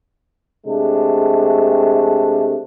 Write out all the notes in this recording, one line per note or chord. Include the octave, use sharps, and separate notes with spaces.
C3 G#3 A3 D4